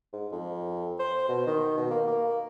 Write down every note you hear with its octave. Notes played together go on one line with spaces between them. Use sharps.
G#2
F2
C5
B2
D#3
B2
A#3
A#3